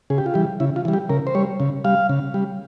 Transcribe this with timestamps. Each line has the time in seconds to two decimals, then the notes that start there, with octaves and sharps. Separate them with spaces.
0.10 C#3 G#4
0.18 G4
0.26 F4
0.34 E3 G3 G4
0.60 C#3 E4
0.76 F4
0.85 E3 G3
0.93 G4
1.10 C#3 A#4
1.27 C5
1.35 G3 C#5
1.60 C#3
1.85 G3 F5
2.09 C#3
2.34 G3